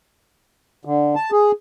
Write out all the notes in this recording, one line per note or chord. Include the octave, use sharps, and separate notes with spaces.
D3
A5
G#4